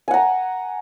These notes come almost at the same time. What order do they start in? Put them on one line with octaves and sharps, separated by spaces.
G#5 F#5 A#5